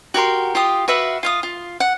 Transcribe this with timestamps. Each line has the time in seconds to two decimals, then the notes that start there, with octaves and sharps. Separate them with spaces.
0.14 F#4 G4 A#4 C6
0.55 F4 G4 D#6
0.88 F#4 B4 E5 F5
1.23 F4 F5 D#6
1.43 F4
1.80 F#5